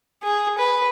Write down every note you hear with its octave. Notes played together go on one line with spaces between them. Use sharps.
G#4
B4